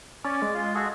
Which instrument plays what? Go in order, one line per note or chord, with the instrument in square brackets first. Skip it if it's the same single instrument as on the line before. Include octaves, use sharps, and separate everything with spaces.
[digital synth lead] C#4 [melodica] D5
[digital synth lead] G#3
[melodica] F4
F#4 G#4 A4